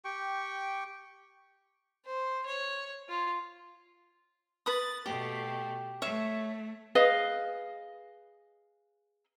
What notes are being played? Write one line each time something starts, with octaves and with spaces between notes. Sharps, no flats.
G4 G5 C#6
C5
C#5
F4
B4 B5 D#6 A6
B2 A3 G4
A3 C#5 E5
G#4 B4 D#5 F5